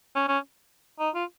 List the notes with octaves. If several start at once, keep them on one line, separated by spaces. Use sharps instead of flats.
C#4
C#4
D#4
F4